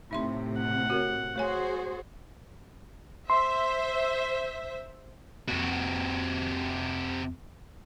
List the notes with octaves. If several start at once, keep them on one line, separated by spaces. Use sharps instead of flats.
A2 C3 D#4 E5 C6
F#5
F#4 A#4 C#5
A3 F#4 G#4 C5 C#5 G#5
C5 E5 C6
F2 C3 A#3 F#4